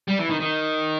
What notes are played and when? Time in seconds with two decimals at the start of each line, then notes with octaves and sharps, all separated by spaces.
0.08 G3
0.19 E3
0.30 D#3
0.40 D#3